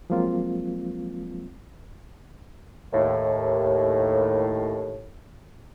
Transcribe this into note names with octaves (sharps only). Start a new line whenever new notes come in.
F3 F#3 G#3 A#3 C4 F4
D#2 A2